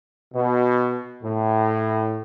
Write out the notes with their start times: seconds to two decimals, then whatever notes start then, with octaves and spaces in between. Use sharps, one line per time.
0.34 B2
1.23 A2